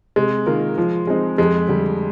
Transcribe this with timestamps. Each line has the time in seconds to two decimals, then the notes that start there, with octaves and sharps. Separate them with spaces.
0.16 C3 G#3
0.46 D#3 A#3 F4 A#4
0.78 F3
1.07 G#3 C4 D#4
1.38 F2 G#3
1.68 D3 G3